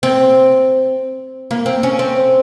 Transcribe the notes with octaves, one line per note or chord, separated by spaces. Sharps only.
C4
A#3
C4
C#4
C4